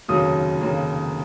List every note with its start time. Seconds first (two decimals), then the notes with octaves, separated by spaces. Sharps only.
0.08 F1 D#2 C#3 F#3 A#3 D#6
0.61 F1 D#2 C#3 F#3 A#3